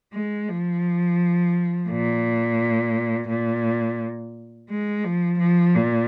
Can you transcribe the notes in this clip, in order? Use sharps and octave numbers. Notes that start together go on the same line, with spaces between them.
G#3
F3
A#2
A#2
G#3
F3
F3
A#2